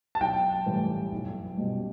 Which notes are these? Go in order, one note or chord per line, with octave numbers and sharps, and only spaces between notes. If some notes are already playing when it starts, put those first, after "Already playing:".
A5
B1 G5
A2 E3 G3
B1
B2 G3